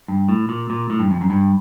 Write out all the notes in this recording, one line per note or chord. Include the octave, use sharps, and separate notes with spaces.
G2
A2
A#2
A#2
A2
G2
F2
F#2
G2